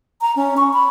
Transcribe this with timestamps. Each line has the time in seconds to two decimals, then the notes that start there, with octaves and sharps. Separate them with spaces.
0.22 A#5
0.36 C#4
0.57 C#6
0.73 B5